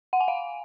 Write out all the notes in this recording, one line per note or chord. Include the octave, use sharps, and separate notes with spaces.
F#5
G#5
F5